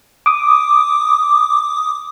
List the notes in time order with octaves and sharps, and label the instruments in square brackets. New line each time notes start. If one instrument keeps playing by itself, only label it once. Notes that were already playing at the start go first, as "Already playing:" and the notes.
[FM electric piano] D6 D#6